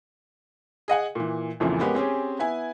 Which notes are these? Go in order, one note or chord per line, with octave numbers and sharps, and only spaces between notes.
G#4 D#5 F#5 G#5
A#2 E3
A#1 F2 A#2 C#3 E3
G#3 A#3 B3 C#4 G4
C4 C#4 G4 G#4
B3 E4 G#5